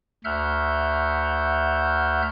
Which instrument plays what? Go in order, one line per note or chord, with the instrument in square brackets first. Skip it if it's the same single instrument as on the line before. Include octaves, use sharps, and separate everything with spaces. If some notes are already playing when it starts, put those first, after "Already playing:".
[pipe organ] D2 E5 F#5 F6 G6